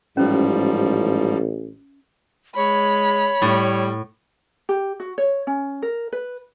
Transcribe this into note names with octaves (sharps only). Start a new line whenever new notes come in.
A1 G#2 F3 G3 C#4
G#3 C#5 B5
A2 G3
G4
F#4
C#5
C#4
A#4
B4